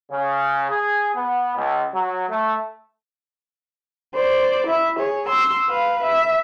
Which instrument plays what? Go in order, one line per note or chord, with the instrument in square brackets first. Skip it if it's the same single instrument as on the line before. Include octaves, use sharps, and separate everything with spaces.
[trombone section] C#3
G#4
B3
C#2
F#3
A3
[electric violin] C5 D5
E4 E5
G#4 C#5
C6 E6
B4 F5
E5